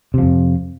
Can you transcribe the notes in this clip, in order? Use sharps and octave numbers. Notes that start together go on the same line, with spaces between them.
F2 C3 F3